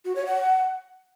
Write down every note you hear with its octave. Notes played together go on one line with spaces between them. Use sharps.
F#4
C#5
F#5